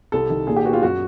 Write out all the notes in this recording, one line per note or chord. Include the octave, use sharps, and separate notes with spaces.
C2 A4
D#3
A#2 G#4
G4
B3 F#4
F4
F#2 F#4